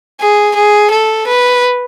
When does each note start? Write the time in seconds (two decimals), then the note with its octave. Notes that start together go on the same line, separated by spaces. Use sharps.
0.20 G#4
0.55 G#4
0.91 A4
1.27 B4